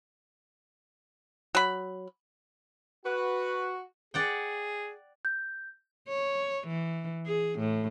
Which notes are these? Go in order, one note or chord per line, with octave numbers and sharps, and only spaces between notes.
F#3 B5
F#4 B4
G#4 D5 F#5 G5
G6
C#5
E3
G#4
A2